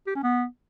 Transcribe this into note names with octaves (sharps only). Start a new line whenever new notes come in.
G4
C#4
B3